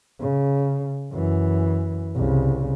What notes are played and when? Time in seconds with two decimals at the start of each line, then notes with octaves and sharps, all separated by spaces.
0.19 C#3
1.11 F#2 E3
2.15 C2 C#3